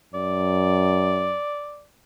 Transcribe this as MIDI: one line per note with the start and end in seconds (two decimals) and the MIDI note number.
0.14 1.37 42
0.14 1.84 74